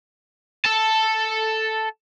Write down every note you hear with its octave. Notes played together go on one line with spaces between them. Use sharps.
A4 A5